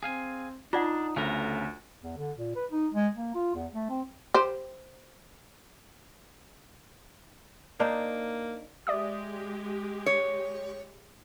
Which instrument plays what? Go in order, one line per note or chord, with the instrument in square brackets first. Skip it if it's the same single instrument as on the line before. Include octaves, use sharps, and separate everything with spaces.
[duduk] C4 [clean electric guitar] G#4 F5 G#5
[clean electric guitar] D4 [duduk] D#4 [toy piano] F4 D5 F#5 [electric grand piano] A5
[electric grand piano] D2 [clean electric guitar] C#3 B3 A#4 [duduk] A3
[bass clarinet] E2
D3
A#2
B4
D#4
G#3
A#3
F4
E2
A3
C4
[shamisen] G4 C5
[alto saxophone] A#3 [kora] D4 D#4 C5
[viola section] G#3 G4 [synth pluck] D5 E5 D#6
[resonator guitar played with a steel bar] C#5